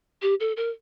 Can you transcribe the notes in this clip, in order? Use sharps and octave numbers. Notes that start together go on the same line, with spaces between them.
G4
A4
A#4